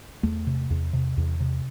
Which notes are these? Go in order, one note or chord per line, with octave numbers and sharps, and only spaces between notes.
E2 A3
C3
E2
C3
E2
C3